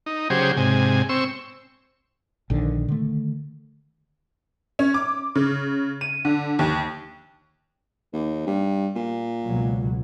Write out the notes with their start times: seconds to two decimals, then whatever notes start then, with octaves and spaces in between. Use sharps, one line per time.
0.06 D#4
0.30 C#3 F#3 G4 G#4 C5
0.57 G#2 C3 G#5
1.09 C4 C#6 E6
2.50 A#1 D3 D#3
2.88 D3 D#3 A3
4.79 C#4
4.94 D6
5.35 C#3
6.01 D#7
6.25 D3
6.59 D#2
8.13 D#2
8.47 G2
8.95 A#2
9.45 C#2 B2 F#3